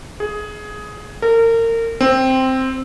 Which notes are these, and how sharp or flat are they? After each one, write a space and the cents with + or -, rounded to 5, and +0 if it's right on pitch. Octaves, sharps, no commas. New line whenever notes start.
G#4 +10
A#4 -30
C4 +0